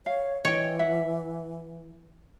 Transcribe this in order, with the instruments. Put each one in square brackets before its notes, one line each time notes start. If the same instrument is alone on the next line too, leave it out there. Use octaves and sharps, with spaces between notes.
[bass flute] C#5 [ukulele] F5
[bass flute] E3 [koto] C#5 [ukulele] D#5 G5
[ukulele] E5 F#5